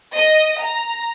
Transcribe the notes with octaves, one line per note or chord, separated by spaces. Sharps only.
D#5
A#5